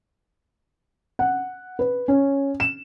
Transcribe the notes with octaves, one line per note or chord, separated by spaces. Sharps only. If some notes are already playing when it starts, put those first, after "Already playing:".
F#5
B4
C#4
E7